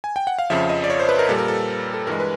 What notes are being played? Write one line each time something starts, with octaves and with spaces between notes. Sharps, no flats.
G#5
G5
F#5
F5
F2 C#3 F3 E5
D#5
D5
C#5
C5
B4
A#4
A#2 G3 A4
A#4
A4
A4
G2 E3 G#3 A#4
B4